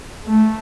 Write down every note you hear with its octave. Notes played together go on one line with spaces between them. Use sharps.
A3